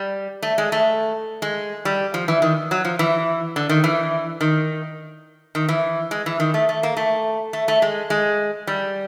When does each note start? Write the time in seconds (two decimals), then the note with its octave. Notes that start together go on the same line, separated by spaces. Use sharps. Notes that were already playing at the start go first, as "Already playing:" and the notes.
Already playing: G3
0.42 A3
0.58 G#3
0.72 A3
1.42 G#3
1.85 G3
2.14 F3
2.28 E3
2.42 D#3
2.71 F#3
2.85 F3
2.99 E3
3.56 D3
3.69 D#3
3.84 E3
4.41 D#3
5.55 D#3
5.69 E3
6.11 G#3
6.26 E3
6.40 D#3
6.54 A3
6.69 A3
6.83 A#3
6.97 A3
7.53 A3
7.68 A3
7.82 G#3
8.10 G#3
8.67 G3